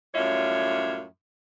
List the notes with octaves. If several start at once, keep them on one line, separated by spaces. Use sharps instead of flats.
F#2 A2 G3 F4 C#5 E5